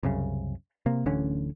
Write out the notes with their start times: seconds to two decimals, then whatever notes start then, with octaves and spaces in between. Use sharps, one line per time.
0.03 C2 F#2 C#3
0.86 C3 A#3
1.06 D1 A1 D3 C#4